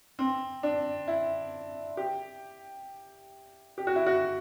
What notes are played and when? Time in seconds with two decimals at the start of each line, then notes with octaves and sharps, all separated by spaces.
0.19 C4
0.63 D4
1.08 E4
1.97 G4
3.78 G4
3.87 F#4
3.96 E4
4.07 F#4